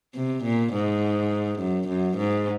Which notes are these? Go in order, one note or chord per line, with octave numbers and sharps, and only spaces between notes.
C3
A#2
G#2
F#2
F#2
G#2